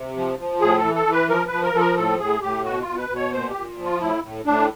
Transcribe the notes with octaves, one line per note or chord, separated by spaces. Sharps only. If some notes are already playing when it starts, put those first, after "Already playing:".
Already playing: C3
F3
F3
A2 G#4
A4
E3
A4
E3
B4
F3 A#4
B4
F3
A#4
F3 A4
A#4
A2 A4
A2 G#4
A2 G4
B2 F#4
F4
B2
B4
B2
C#5
A#2 C5
G4
A#2
F3
F4
A2 E4
A2
A2 D4